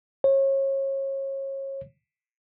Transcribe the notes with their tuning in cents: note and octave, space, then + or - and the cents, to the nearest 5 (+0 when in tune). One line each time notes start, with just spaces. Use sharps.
C#5 -30